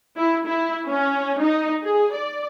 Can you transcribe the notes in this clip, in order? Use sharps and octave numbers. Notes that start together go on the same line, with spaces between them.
E4
E4
C#4
D#4
G#4
D5